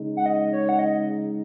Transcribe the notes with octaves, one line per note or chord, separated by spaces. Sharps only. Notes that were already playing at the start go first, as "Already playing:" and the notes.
Already playing: C#3 G#3 D#4
F#5
D#5
C#5
F#5
D#5